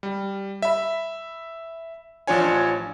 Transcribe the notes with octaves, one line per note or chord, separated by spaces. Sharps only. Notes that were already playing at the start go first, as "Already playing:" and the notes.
G3
E5 B5
A1 F3 D4 F4 C#5 G#5